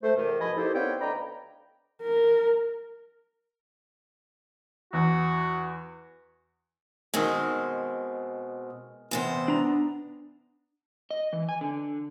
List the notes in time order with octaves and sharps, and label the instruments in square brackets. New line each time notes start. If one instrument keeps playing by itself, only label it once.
[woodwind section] A3 C5
E2 C3 D#3
G#2 B2 F3 D#5 G#5 B5
A#3 D#4 E4 G4 A4 C5
B3 C4 C#5 D5 F5 G5
D2 D5 D#5 G5 A#5 B5
[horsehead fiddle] A#4
[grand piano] E2 [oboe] F#4
[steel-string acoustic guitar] B2 C4 [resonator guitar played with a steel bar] D#3 G#3
[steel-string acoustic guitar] E2 C3 C5 [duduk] B3
[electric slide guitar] D4 A#5
D#5
E3
G#5
D3